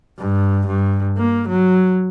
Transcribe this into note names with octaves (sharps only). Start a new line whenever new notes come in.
G2
G2
A#3
F#3